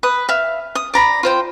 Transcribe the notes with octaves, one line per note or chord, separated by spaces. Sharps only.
B4 D#6
E5 F5
D#6
D5 A#5 B5
F4 C5 G5